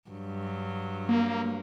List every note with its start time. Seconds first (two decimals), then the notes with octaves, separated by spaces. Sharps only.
0.10 G2 F#3
1.09 A#3